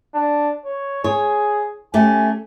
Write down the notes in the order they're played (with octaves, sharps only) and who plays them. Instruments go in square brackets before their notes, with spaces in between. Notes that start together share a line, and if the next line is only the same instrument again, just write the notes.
[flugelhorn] D4
C#5
[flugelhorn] G#4 [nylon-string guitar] C#5
[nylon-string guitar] A3 C#4 G4 [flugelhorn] G#5